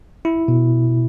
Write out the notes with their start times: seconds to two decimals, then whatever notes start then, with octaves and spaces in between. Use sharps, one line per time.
0.25 E4
0.48 B2